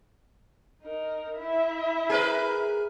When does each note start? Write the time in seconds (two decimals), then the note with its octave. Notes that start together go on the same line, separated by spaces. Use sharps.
0.83 D#4 A#4
1.37 E4 E5
2.09 G#4 A#4 B4